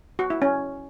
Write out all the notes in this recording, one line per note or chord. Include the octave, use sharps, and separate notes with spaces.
F#4
E4
C#4